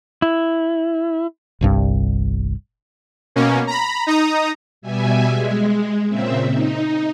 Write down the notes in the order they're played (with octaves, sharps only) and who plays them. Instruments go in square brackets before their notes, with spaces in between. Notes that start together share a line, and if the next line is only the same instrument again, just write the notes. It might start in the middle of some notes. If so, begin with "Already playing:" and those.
[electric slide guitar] E4
[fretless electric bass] G1 C2 G2
[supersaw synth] B2 A#3 C#4
A#5 B5
D#4 A#5 D#6
[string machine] B2 G3 E5 G#5
G#3
A#2 C#3 C4 E5
D#4